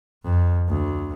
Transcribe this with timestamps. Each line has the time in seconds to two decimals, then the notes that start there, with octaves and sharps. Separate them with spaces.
0.24 F2
0.68 D2